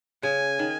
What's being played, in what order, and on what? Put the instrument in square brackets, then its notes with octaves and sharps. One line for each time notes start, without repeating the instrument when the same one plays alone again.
[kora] C#3 [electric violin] G#5
[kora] D#3